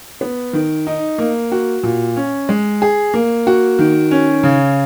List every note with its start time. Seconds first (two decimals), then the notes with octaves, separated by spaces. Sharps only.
0.21 B3
0.53 D#3
0.87 D#4
1.18 A#3
1.52 F#4
1.83 A#2
2.16 C#4
2.49 G#3
2.82 G#4
3.14 A#3
3.47 F#4
3.79 D#3
4.11 C#4
4.43 C#3